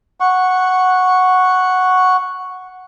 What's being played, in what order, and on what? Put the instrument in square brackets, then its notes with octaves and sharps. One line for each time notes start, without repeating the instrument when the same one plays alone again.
[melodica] F#5 C#6